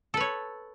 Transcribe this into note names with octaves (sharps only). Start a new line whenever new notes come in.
A4 B4 C#5